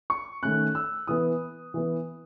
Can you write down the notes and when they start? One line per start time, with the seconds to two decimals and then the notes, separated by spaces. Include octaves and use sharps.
0.10 C#6
0.43 D#3 A3 C#4 F#6
0.75 E6
1.07 E3 B3 D#6
1.74 E3 B3